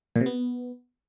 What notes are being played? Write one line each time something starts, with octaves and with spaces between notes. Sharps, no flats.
A#2
C3
B3